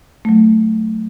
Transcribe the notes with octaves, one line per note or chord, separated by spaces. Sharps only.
F#3 A3